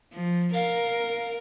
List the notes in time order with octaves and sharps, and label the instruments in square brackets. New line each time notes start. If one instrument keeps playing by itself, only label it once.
[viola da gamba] F3
[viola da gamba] A#4 [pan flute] F5